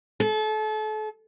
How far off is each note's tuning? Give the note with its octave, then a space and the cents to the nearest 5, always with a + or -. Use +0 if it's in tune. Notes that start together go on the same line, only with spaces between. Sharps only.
A4 -35